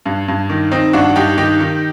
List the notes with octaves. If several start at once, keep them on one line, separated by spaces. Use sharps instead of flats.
G2
G2
D#3
D#3 C4 D#4
G2 D4 F#4
G2 D#4 G4
D#3 D#4 G4
D#3